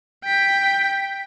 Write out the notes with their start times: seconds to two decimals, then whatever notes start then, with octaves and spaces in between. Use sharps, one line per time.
0.24 G5 B6